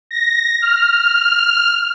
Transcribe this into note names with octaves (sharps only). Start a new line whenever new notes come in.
A#6
F6